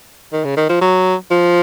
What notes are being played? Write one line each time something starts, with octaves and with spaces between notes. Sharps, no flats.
D#3
C#3
D#3
F3
F#3
F3